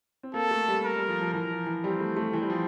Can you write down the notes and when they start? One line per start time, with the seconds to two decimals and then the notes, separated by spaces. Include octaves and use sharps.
0.23 C4
0.34 A#3 A4
0.51 A3
0.68 G3
0.85 A#4
0.96 G3
1.08 F3
1.21 F3
1.34 E3 A#4
1.51 F3
1.66 E3
1.83 G3 C4
2.00 A3
2.16 A3
2.33 E3 C4
2.42 G3
2.50 F3